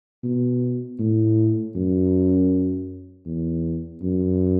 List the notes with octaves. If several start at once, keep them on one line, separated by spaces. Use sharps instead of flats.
B2
A2
F#2
E2
F#2